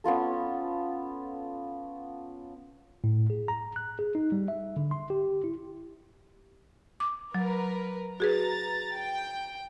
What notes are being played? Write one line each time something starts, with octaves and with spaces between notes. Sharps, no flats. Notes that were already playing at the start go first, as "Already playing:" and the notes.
B3 C#4 F4 A4
A2
G#4
A#5
F#6
G#4
D#4
G3
E5
D3
C6
G4
E4
D6
F#3 A#4 B4
F#4 G#4 B4 A#5 A6
G5